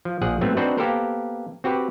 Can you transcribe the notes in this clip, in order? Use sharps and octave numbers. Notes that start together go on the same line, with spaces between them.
F3
A#1 F3 G#4 F#5
G#2 F#3 A3 B3 C4
C4 D4 D#4 F#4 B4 C5
A#3 B3 G4 A4 A#4 C5
C4 F#4 G4 B4